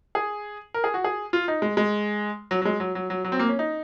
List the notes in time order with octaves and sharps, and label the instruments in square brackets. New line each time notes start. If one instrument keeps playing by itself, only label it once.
[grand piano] G#4
A#4
G#4
F#4
G#4
F4
D#4
G#3
G#3
F#3
F#3
G#3
F#3
F#3
F#3
F#3
C4
A#3
C#4
D#4